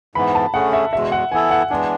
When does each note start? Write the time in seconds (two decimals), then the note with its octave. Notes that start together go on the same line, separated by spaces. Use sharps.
0.15 G#2 E3 B3 B5
0.35 A5
0.54 D3 A3 C#4 G#4 F#5
0.73 E5
0.93 E2 B2 G#3 E5
1.12 F#5
1.31 E3 B3 E4 A4 G#5
1.51 F#5
1.70 E3 G#3 B3 D4 G#5